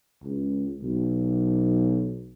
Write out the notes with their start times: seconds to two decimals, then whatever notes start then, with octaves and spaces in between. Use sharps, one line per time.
0.23 C#2
0.82 B1